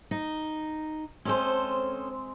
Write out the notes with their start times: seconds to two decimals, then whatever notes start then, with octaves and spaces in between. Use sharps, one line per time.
0.11 D#4
1.25 G#3 C4 C#4 A4 C5